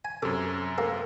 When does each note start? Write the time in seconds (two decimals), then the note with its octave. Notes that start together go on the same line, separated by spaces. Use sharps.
0.05 G#5
0.22 F#2 C3 A4 D6
0.78 A#3 G4 A4